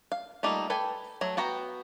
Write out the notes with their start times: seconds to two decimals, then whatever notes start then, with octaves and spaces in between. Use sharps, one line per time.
0.12 F5
0.43 G3 A3 A#3 D#4 F4
0.70 A4 B4 G5 G#5
1.21 F#3 A3
1.37 B3 F#4 G5 A#5